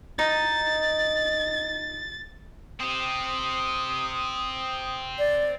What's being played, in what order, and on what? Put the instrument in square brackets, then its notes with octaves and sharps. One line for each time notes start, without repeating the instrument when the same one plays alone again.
[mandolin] D#4 [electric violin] A6
[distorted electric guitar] C4 G4 [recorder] D#6
[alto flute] D5